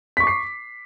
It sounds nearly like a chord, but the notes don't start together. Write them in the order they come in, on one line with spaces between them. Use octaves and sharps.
B6 C#6 D6 C7